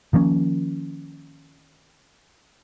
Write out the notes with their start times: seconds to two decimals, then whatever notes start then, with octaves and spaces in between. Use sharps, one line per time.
0.13 D#3 F3 A#3 C#4